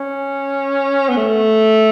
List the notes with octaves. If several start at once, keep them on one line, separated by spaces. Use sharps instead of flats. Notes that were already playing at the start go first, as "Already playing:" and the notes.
Already playing: C#4
B3
A3